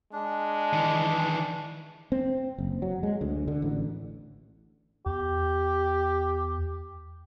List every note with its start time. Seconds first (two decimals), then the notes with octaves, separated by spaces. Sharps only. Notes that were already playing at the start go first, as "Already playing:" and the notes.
0.13 G#3 D4
0.73 D#3 E3
2.12 C4
2.58 F#1
2.82 F#3
3.03 G#3
3.21 D2
3.48 D3
3.62 A1
5.06 E2 G4